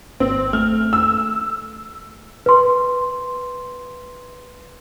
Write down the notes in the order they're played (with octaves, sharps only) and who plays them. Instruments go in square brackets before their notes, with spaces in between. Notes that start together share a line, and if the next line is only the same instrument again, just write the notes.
[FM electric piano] G#1 [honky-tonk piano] C4
[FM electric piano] A3 [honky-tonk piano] F6
[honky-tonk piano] E6
[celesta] B4 C6